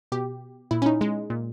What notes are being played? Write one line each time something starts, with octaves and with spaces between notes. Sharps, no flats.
B2 G4
A#2 E4
C#4
D#4
G#3
A#2